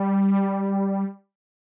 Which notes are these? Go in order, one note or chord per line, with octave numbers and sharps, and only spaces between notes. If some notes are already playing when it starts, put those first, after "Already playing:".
Already playing: G3